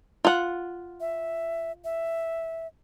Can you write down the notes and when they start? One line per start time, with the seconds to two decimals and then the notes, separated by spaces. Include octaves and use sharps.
0.25 F4 F#5
1.00 E5
1.84 E5